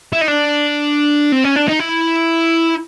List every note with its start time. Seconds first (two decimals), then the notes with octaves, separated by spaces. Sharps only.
0.13 E4
0.21 D#4
0.28 D4
1.32 C4
1.44 C#4
1.56 D4
1.68 D#4
1.79 E4